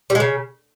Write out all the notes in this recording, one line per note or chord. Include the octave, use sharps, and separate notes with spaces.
G3
G#3
C#3